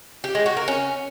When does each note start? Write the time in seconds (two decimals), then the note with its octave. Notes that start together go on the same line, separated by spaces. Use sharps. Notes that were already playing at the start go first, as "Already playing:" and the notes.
0.24 G4
0.35 G#3
0.46 F#4
0.57 A#4
0.68 C#4